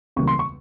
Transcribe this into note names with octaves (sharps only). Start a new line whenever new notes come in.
E1 E2 C#3 G3 A#3 C#6
C6
C#6